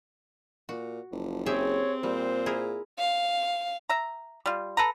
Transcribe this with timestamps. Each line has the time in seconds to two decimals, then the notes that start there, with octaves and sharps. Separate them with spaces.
0.69 A#2 F#4
1.12 F#1 F3
1.46 C4 G4 G#4 C#5 E5
2.03 A#2 G3 C5
2.46 E4 G#4 A#4
2.98 F5
3.89 E5 A#5
4.46 G3 F4
4.77 A4 B4 A#5